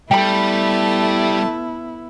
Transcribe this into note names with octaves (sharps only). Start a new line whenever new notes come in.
G3 A3 B3 E4 G5 A5 B5